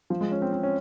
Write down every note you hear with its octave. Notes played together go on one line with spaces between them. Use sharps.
F3
G#3
C#4
C4
C4
C#4